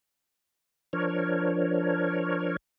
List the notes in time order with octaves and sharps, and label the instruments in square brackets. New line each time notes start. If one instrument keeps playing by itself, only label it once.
[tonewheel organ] F3 D4 A#4 C#5